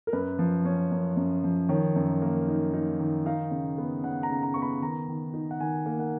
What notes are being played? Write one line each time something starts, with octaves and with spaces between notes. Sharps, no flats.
A#4
F#2 B4
F3
C#4
F#2
F#2
F3
D#3 C#5
F#2
A#3
D#4
D#4
D#3
D#4 F5
C#3
B3
C#3 F#5
A#5
C#3
A#5
B3 C#6
B5
D#3 A#5
D#3
D#4
F#5
D#3 G#5
A#3
F#5